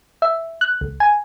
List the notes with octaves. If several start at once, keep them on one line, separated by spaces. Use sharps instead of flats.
E5
F#6
C#2
G#5